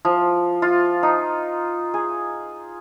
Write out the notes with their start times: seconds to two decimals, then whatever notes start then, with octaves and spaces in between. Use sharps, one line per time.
0.05 F3
0.62 F4
1.03 D#4
1.94 G#4